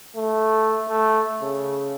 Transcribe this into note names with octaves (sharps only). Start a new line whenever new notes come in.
A3
A3
C#3